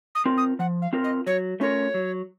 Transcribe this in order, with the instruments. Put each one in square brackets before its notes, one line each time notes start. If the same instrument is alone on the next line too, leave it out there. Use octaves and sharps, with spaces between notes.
[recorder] D#6
[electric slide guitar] C4 F4 A#4
[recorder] D#6
[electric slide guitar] F3 [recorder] F#5
[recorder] F5
[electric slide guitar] C4 F4 A#4
[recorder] D#5
[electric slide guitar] F#3 [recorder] C#5
[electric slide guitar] A3 C#4 F4 A#4 [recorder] C#5
[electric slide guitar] F#3